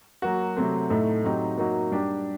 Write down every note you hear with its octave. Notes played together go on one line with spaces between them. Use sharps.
F#3 A#3 F#4
C3 F#3 A3 C4
A2 A3 D#4
F#3 C4 D#4 G4
F#3 A#3 D#4 F#4
G3 D4 G4